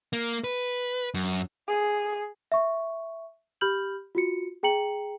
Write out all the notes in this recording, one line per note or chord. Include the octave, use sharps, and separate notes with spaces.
A#3
B4
F#2
G#4
E5 C#6
G4 B5 F6 G6 F#7
F4 F#4 C#7
G#4 G5 A#5 C#7 F#7